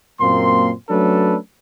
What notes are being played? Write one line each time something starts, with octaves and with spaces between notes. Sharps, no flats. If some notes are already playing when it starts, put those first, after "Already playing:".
F#2 A#2 A#3 C4 C6
F#3 A3 C#4 D4 A4 B4